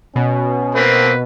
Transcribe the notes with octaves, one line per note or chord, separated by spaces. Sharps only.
B2 C#4
A#3 C4 B4